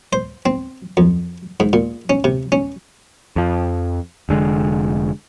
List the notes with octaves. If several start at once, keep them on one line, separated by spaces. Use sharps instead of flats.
C5
C4
F2
G#2
A#2
C#4
C3
C#4
F2 F3
F1 D3 G#3